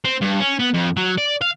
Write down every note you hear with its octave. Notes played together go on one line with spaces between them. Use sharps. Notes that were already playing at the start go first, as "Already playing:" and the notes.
C4
G2
C#4
B3
F2
F#3
D5
F5